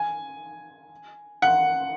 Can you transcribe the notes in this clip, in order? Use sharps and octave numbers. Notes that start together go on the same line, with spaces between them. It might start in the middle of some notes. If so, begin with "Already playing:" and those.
Already playing: G#5
F#5